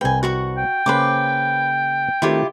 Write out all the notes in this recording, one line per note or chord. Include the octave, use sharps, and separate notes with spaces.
C2 C4 B4 G5 G#5
F#4 F#5 C#6
G5
C#3 A#3 C#4 B4 C5 D6
D#3 A3 C4 E4 F4 G4